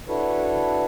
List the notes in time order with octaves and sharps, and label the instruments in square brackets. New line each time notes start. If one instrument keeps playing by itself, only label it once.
[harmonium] D4 E4 F#4 A4 B4 C#5